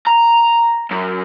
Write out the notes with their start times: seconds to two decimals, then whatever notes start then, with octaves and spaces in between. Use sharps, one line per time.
0.07 A#5
0.91 F#2